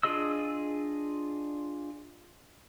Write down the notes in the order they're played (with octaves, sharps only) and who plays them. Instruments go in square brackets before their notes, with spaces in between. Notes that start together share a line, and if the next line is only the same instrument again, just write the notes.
[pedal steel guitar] D4 F4 G#4 D#5 E6